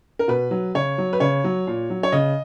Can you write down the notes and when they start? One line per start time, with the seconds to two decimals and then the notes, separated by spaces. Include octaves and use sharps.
0.19 A#4
0.28 B2 B4
0.51 F#3
0.75 C#3 C#5
0.98 F#3
1.13 B4
1.20 C#3 C#5
1.44 F#3
1.67 A#2
1.90 F#3
2.03 C#5
2.12 C#3 D#5